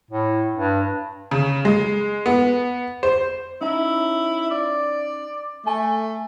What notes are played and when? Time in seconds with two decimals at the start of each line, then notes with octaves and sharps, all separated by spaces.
0.11 A2
0.55 G2
1.31 C#3
1.65 G#3
2.26 B3
3.03 C5
3.61 C#4 D#4 E4
4.51 D5
5.66 A3 G#5